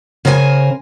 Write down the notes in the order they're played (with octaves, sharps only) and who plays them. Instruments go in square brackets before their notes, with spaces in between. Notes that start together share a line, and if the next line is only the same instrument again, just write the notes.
[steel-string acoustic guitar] C#3 A#4 C5 E5 G#5